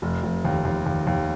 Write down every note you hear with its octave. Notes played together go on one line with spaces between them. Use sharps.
F1
F1
D#2
D#2
D#2
D#2